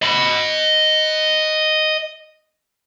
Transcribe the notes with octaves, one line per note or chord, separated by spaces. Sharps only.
D#5 B5